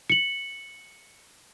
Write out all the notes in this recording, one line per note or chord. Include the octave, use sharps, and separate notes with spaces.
C#7 F#7